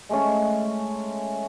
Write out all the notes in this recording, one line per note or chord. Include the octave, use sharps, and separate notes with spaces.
G#3 A3 C#4